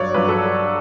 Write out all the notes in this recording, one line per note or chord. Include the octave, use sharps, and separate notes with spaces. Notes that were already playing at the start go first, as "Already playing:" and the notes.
Already playing: G2 F#3 C#5 D5
G2 F#3 B4
A4